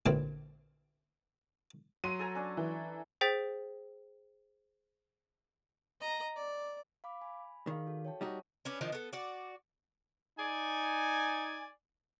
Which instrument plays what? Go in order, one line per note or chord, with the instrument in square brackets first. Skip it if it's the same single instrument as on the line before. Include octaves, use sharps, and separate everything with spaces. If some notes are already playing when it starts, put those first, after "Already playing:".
[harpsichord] A1 A#2 D3 E3 C4
[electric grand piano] F#3 C6 [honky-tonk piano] D#7
[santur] A4 G#5 A#5
C#4 D4
[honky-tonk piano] E3
[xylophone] G#4 C5 G5 A6 B6
[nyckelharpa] D#5 A#5
D5
[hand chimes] F5 B5 D6
G#5 B5
[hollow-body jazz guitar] D#3 [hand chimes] G#4 D5 F5
[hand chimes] F#4 A4
C#5 G5 A5
[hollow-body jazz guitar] G3 D#4 F#4
[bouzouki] C#4 D4 B4
D#3 F3 D4 D#4
B3 A4
F#4 D5
[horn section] D#4 D5 G#5